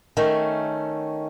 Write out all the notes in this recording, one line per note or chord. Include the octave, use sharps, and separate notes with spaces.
D#3 A3 C#4